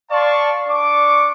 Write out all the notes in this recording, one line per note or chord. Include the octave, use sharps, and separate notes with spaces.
D5 F5 A5 C6 C#6
D4 C#6 D6